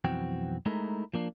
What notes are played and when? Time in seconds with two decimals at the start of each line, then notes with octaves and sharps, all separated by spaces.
0.04 B1 F2 E3 C4 F#4 G5
0.66 G#3 A3 D#4 E4 A#4
1.13 F3 A#3 D4